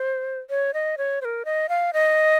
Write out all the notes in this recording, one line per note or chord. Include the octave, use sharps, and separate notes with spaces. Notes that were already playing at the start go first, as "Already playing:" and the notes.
Already playing: C5
C#5
D#5
C#5
C5
A#4
D#5
F5
D#5